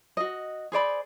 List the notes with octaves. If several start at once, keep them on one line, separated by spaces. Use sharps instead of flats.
F#4 D#5
G#4 C5 D5 B5